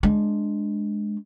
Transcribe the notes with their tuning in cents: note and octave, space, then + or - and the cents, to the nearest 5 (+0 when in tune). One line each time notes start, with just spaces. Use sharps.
G#3 +5 D4 +5